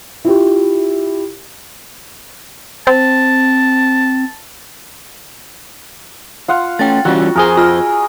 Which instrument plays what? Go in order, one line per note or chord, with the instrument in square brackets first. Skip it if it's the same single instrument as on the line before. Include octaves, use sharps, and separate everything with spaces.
[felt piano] E4 F4 G4
[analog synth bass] C4 [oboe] A5
[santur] F4 F5 F#5
[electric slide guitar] A3 C#4 [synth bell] G5 A6
[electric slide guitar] E3 G3 C#4 [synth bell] F4 [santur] F#4
[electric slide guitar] F2 C5 [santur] G#4 A#4
[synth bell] F4 F6